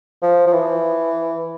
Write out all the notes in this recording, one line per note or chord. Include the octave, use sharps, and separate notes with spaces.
F3
F3
E3